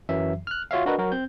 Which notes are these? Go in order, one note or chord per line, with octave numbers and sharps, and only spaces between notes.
F#2 E3 F#3 E5
F6 F#6
F4 F#4 C#5 E5 F5
D4 F#4 A#4 B4 D#5
F#3 F#4 A#4
C4 G6